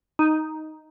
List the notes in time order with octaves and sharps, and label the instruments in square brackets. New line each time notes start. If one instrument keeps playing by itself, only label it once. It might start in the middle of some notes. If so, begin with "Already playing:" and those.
[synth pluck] D#4